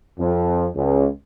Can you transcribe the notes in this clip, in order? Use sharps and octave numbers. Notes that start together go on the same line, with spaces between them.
F2
C#2